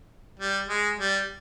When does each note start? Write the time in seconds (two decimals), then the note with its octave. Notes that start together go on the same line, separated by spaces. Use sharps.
0.39 G3
0.69 G#3
0.98 G3